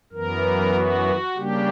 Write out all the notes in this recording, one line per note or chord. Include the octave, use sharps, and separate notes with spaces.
F#2 E3 B3 A#4
F#4
C#3 G3 A#3 D4 G4